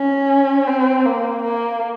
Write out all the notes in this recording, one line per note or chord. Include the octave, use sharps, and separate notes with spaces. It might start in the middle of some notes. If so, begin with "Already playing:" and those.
Already playing: C#4
C4
A#3
A#3